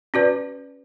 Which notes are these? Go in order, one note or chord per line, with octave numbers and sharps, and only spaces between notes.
C#4 F#4 B4 D5